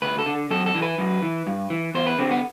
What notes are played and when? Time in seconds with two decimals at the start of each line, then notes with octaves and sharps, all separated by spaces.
0.02 D2 B4
0.19 A4
0.26 D3
0.51 F#2 A4
0.66 A4
0.75 E3
0.82 B4
0.98 F#2
1.23 E3
1.47 G2
1.70 E3
1.95 E2 C5
2.06 B4
2.18 D3 C4
2.31 B3